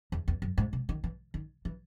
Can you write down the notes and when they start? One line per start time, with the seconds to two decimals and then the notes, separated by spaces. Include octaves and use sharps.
0.12 E2
0.28 E2
0.42 F#2
0.58 G#2
0.73 C3
0.89 D#3
1.04 E3
1.34 D#3
1.65 E3